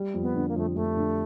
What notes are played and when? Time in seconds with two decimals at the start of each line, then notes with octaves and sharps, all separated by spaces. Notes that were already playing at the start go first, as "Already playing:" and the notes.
Already playing: G3
0.14 F2
0.21 B3
0.35 D3
0.48 A#3
0.56 F2 A3
0.75 F2 A3
0.97 D3